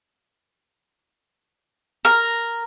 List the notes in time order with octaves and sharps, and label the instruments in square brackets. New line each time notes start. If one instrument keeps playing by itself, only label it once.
[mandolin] A#4